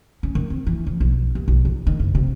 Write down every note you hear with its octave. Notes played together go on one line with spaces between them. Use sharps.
C#4
D#3
C4
E3
F2
B1
D#2
B1
E2
D#3
F#1
C3